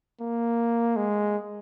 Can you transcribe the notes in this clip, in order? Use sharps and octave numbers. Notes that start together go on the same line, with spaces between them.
A#3
G#3